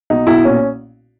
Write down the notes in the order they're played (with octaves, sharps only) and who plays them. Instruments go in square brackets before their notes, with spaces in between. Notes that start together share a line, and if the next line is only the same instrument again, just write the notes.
[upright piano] B1 D#4
B1 E4
A#2 C#4